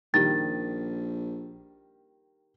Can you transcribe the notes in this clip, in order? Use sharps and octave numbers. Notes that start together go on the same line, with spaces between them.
A#1 D#3 G3 A6